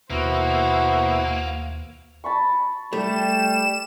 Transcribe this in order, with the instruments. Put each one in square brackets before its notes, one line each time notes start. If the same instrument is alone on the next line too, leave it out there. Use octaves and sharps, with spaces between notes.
[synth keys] D#2 [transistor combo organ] B2 E4 [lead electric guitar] A#3 [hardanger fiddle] F#4 C5
[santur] A5 B5 C#6
[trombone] G3 [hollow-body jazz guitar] A3 [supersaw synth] E7